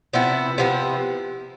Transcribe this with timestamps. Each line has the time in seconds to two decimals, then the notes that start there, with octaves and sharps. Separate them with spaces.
0.13 C3 F3 B3 E4
0.58 C3 F3 B3 E4